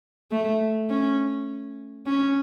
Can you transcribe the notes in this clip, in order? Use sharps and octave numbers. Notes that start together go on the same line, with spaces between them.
A3
C#4
C#4